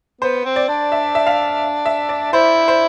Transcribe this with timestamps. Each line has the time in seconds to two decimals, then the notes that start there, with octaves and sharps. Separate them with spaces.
0.21 B3 C5
0.45 C4
0.56 D5
0.69 D4
0.92 E5
1.15 E5
1.27 F5
1.86 E5
2.09 D5
2.33 E4 C5
2.68 C5